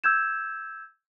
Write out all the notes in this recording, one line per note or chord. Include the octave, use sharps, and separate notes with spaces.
E6 G6 G#6 E7